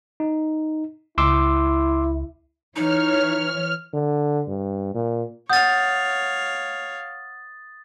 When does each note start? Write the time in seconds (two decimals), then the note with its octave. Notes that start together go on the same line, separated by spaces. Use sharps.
0.20 D#4
1.18 C#2 E4 C6 D6 E6
2.76 E3 D#4 C#5 F6
3.93 D3
4.48 G2
4.94 A#2
5.50 C#5 F5 F#5 D#6 G6 A6